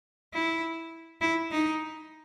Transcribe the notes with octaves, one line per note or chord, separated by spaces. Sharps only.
E4
E4
D#4